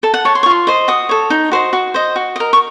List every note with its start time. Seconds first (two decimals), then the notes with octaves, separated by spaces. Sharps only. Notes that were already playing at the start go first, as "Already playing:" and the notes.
0.03 A4 A5
0.14 F#5
0.25 C#5 A5
0.35 C6
0.43 C#6
0.46 F4 C6
0.67 C5 D#5
0.88 F#4 D#6
1.09 A4 C#5
1.30 D#4
1.52 F#4 C5 D#5
1.73 F#4
1.94 C5 D#5
2.16 F#4
2.36 A#4 D#5
2.53 C#6